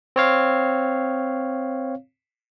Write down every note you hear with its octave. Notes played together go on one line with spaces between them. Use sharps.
C4 C#5 F5